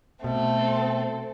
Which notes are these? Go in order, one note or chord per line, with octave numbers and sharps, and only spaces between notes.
B2 A3 C4 A4